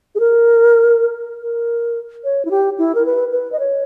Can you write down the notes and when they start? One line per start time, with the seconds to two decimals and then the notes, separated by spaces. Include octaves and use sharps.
0.15 G#4
0.20 A#4
1.42 A#4
2.24 C#5
2.45 E4
2.51 G4
2.78 E4
2.95 A#4
3.06 B4
3.32 B4
3.52 D#5
3.59 C#5